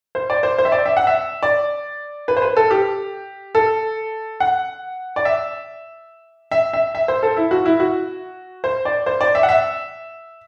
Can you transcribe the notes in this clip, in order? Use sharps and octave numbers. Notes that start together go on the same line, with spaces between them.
C5
D5
C5
C5
E5
D5
E5
F#5
E5
D5
B4
C5
B4
A4
G4
A4
F#5
D5
E5
E5
E5
E5
C5
A4
E4
F#4
E4
F#4
C5
D5
C5
D5
E5
F#5
E5